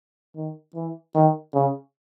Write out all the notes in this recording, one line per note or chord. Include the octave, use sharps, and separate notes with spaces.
D#3
E3
D#3
C#3